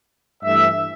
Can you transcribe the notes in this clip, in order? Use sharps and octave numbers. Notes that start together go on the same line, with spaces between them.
G2 E3 A3 E5